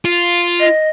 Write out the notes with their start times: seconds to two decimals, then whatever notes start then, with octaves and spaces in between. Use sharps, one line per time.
0.05 F4
0.60 D#5